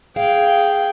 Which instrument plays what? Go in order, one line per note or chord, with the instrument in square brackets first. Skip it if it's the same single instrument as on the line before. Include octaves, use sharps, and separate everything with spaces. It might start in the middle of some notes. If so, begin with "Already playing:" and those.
[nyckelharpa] G#4 G5 [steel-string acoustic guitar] F5